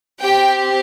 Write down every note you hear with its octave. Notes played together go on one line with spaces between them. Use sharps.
C4 G4 G5